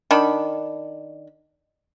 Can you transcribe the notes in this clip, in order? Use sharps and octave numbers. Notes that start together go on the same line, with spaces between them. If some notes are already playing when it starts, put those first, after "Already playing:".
D#3 D4 B5